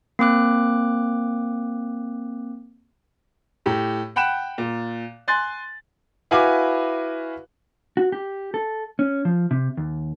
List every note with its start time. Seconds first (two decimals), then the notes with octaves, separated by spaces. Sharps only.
0.19 A#3 C4 D6 F#6
3.66 A2 G4
4.16 F#5 G5 B5 F#6 E7
4.58 A#2
5.28 G#5 C6 F#6 A6
6.31 E4 F#4 B4 F5 G#5 D6
7.97 F#4
8.12 G4
8.54 A4
8.99 C#4
9.25 F3
9.51 C3
9.77 D#2